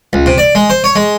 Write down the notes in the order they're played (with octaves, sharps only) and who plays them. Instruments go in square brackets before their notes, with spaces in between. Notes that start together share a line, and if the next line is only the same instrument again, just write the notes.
[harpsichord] C#2
C3
D5
G#3
C5
C#5
G#3